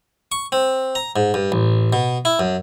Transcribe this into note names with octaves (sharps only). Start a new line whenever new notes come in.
C#6
C4
A#5
G#2
G2
A1
B2
E4
F#2